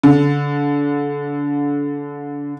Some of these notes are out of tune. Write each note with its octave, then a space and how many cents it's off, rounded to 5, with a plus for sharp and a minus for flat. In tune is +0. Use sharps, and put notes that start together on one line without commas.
D3 -30